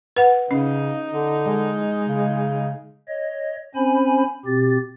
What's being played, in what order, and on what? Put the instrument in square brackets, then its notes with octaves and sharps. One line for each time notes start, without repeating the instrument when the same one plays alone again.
[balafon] B4 F#5
[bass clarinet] C#3 [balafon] C#4 [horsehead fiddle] D#4
[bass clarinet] D3
[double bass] G#3
[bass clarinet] C#3
[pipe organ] C#5 D#5
C4 C#4 C5 G#5 B5
B2 C4 G4 A6